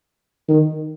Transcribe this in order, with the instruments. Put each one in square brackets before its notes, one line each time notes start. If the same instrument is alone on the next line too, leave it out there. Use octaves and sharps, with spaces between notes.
[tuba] D#3